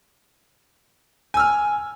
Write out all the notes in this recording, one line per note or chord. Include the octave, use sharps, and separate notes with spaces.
G#5 E6 F6